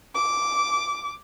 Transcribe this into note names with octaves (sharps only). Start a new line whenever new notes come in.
D6